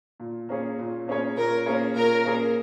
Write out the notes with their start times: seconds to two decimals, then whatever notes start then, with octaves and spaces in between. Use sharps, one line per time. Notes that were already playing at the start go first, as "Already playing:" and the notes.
0.20 A#2
0.49 A#3 C#4 G#4 C#5
0.79 A#2
1.08 A#3 C#4 G#4 C#5
1.37 A#2 A#4
1.66 A#3 C#4 G#4 C#5
1.96 A#2 A#4
2.25 A#3 C#4 G#4 C#5